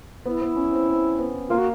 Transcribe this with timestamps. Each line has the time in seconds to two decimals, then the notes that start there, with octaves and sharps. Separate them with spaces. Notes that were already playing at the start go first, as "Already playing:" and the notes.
0.26 B3 E4
0.42 B3
0.56 C#4
0.73 C4
0.88 C4
1.19 B3
1.50 A#3 F4
1.59 F#4